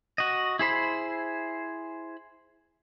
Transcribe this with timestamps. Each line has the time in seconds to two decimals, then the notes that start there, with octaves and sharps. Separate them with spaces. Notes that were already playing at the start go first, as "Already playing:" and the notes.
0.18 F#4 D#5
0.59 E4 G#4 C5 B5